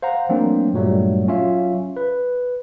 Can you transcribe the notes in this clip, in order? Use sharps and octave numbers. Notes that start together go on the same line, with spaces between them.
C5 F5 F#5 A#5
E3 F#3 A3 A#3 C4 D4
G2 A#2 F#3 G3 A3
F#3 C#4 F4 E5 F5
B4